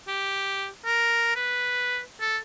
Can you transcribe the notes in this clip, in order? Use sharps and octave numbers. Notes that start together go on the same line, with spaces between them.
G4
A#4
B4
A4